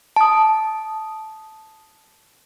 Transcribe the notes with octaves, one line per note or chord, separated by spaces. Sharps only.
A5 D#6